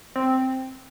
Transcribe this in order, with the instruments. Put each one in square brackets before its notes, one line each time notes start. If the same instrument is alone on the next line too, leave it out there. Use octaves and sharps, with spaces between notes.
[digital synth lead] C4